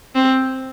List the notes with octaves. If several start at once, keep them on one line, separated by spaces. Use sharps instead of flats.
C4